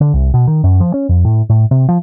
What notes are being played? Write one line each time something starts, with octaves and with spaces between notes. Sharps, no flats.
D3
C2
B2
D#3
F#2
F3
C#4
F2
A2
A2
C3
F3